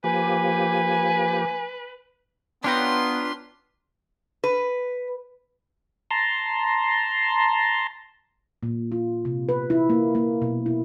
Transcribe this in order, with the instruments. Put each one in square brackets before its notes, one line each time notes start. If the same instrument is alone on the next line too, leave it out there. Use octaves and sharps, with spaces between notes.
[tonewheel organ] F3 A#3 G4 [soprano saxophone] B4 [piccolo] G#5
[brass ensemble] B3 [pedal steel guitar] D4 F4 B4 [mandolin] C#5 G5 A#5 [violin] C6
[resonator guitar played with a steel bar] B4
[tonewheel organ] A5 A#5 C6
[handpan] A#2
F4
C3
B4
E4
A#3
A#3
B2
E4